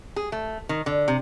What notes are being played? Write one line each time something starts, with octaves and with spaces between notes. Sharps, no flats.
G#4
A3
D#3
D3
C3